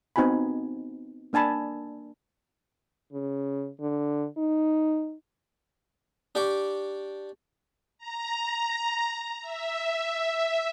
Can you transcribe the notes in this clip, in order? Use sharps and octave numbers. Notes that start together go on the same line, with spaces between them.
B3 C4 D#4 F#4 G#5 B5
A#3 D4 G#5 A5 B5
C#3
D3
D#4
D4 G4 G5 C#6 D6
A#5
E5